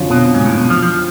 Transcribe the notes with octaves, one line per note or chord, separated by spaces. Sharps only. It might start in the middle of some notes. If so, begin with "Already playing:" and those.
Already playing: F2 D3 F#3 C#4 F4
B2
G#2
A2
B2
F3
F3